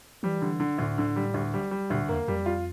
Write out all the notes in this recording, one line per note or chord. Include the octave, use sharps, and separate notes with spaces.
E3 G3
D3
D3
D2 A2
D3
G3
D2
G3
G3
D2 A#2
E2 A#3
F2 G3
F4